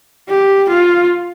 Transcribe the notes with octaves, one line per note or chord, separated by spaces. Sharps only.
G4
F4